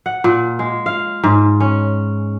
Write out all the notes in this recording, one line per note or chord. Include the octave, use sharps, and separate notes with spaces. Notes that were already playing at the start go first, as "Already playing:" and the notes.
F#5
A#2
G#3
F5
G#2
C#4